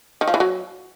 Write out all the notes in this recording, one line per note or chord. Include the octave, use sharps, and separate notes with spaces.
D#3
F3
E3
F#3